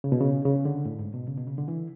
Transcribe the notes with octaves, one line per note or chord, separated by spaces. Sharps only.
C#3
B2
C#3
C#3
D3
A2
G#2
B2
C#3
B2
C#3
D3
E3